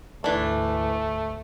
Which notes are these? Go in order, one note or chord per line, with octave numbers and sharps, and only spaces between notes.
D2 G#2 E3 A3 D4